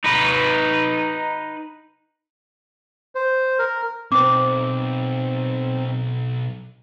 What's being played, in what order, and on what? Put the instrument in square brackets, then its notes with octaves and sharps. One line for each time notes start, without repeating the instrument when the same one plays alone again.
[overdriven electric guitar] D#4 B4
[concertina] C5
A#4
[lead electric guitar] B1 [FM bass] C4 [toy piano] C5 D6